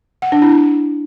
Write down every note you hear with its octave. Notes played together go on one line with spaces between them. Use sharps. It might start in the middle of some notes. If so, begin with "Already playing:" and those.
F#5
D4
E4